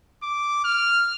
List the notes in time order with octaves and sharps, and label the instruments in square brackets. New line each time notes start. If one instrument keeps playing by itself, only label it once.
[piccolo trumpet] D6
F6